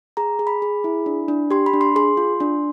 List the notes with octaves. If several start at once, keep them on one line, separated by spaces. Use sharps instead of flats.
G#4 A#5
G#4
B5
G#4
E4
D4
D4
G4 C6
B5
D4
C6
G#4 C6
F4
D4